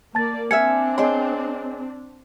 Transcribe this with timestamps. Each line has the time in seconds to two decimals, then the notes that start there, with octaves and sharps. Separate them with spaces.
0.15 A#3 D5 A5 A6
0.51 C4 D4 E5 F5 G#5 C#7
0.98 G#4 C#5 D#5 G5 C6